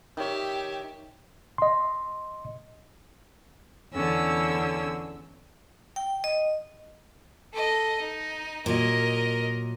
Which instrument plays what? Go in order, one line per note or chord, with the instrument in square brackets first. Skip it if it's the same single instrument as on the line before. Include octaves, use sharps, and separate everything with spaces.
[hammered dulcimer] D#3 C#5 [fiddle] G4 E5
[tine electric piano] D#5 C6
[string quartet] E2 D3 C#4 E6
[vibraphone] G5
D#5
[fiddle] A4 D#5
D#4
[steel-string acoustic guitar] A#2 F#3 [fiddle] A#4 D#5